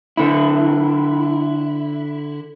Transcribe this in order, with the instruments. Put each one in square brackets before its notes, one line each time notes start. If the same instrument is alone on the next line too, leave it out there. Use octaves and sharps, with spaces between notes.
[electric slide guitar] D3 E4